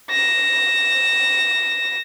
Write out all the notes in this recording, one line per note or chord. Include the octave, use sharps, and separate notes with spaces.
A#6 E7